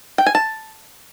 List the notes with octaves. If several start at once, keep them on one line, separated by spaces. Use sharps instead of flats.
G5
G#5
A5